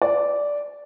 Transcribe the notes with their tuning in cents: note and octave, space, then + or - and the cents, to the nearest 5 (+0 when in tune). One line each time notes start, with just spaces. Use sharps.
D5 -10